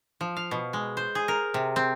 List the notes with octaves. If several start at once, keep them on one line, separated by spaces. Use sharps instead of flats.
F3
F5
B2
G#3
C5
G#4
A#4
C3
C4